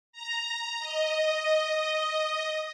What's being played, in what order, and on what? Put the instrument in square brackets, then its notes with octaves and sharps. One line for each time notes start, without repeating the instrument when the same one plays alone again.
[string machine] A#5
D#5